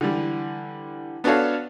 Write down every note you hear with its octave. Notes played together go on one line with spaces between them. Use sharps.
D3 E3 G3
B3 D4 F#4 A4 C#5 F5